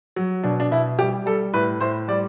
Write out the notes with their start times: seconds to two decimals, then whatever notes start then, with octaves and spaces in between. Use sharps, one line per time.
0.16 F#3
0.44 B2 D4
0.60 D4
0.71 B2 E4
0.99 G3 G4
1.26 G3 A4
1.53 A2 B4
1.81 A2 C5
2.08 G3 D5